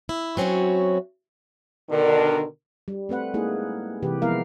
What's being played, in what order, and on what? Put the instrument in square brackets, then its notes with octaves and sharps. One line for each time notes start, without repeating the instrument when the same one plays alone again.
[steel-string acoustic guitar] E4
F#3 C4 C#4 E4 F#4
[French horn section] B2 D3 D#3 D4 A#4
[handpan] G3
A3 C4 B4 F#5
G#3 A#3 D#4 E4 G#4
C3 E3 G4 B4
F3 G#3 B3 E4 A#4 F5